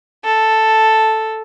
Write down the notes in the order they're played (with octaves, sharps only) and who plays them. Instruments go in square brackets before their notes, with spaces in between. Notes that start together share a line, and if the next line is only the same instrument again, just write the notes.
[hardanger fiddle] A4